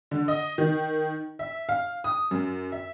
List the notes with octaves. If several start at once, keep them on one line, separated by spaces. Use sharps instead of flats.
D3
D#5
D#3
E5
F5
D#6
F#2
E5